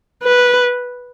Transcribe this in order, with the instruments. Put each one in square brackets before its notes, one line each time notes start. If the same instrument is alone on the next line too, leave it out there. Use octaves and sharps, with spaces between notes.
[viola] B4